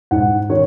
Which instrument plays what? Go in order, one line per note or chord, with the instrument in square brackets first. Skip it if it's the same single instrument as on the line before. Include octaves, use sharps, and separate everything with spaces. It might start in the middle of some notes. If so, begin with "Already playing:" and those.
[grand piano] G#2 F#5
D#3 C#5